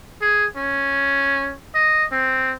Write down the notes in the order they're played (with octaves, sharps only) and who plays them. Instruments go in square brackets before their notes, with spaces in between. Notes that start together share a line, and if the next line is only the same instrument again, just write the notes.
[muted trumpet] G#4
C#4
D#5
C4